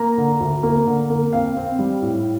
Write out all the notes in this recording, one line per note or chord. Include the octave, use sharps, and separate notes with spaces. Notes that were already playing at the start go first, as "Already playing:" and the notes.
Already playing: A#3 A#5
D3
D2
A#3
D3
A#3
C4 F5
C4
G3
A2